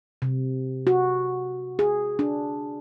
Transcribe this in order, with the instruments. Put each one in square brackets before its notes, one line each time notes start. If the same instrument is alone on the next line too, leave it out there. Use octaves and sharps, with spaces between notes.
[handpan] C3
F#4
G#4
D4